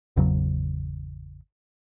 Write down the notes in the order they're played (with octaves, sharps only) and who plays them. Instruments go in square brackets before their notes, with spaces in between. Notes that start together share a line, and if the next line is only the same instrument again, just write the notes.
[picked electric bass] G#1 E2 C#3 F#3